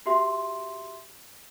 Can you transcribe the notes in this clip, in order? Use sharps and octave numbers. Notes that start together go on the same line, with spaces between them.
F#4 G4 E5 C6